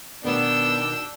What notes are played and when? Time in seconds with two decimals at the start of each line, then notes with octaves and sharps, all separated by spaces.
0.24 B2 D#3 B3 D4 G5 E6